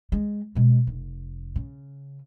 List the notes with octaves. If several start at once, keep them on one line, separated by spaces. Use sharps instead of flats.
G#3
B2 G#3
F1
C#3